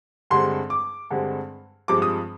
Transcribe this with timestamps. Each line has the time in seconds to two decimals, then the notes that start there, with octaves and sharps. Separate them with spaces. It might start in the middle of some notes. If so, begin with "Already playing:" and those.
0.31 G2 D3 G#3 C4 C6
0.70 D6
1.10 G2 D3 G#3 C4
1.88 G2 F3 G#3 C4 D6
2.02 D#6